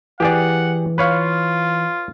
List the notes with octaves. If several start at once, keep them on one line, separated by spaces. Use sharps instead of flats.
E3 G4 G#4 D5 F#5
F4 B4 C#5 F5